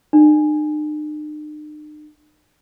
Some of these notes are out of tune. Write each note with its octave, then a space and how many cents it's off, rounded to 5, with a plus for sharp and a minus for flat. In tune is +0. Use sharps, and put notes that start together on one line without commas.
D#4 -45